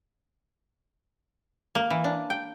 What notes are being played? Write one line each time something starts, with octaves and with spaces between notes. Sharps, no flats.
A#3
E3
D4
G5